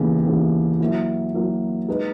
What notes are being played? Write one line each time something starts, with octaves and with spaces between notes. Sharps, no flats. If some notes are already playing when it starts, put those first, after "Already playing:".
Already playing: D#2 C#3 E3 B3
D#2 C#3 E3 B3
F#3 A#3 E4
F#3 A#3 E4
G#3 D#4 G#4 B4